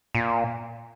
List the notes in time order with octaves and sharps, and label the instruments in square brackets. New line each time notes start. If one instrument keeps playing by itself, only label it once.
[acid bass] A#2